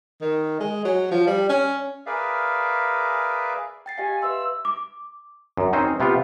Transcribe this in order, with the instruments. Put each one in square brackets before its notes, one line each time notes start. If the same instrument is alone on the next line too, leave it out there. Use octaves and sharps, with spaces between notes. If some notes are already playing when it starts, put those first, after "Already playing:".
[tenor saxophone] D#3
G#3
F#3
F3
G3
C#4
[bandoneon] G#4 A#4 B4 D5 E5 F5
[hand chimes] G5 A6 C7
[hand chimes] G4 D#5 F5 [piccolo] G#5
[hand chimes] B4 E5 C6 [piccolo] E6
[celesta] D6
[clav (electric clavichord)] F#2
C4 C#4 D#4 C5
C3 B3 F4 G4